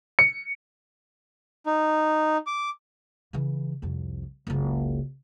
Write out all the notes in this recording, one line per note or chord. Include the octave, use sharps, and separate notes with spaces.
C#7
D#4
D6
C#3 E3
C2 F2
F#1 C#2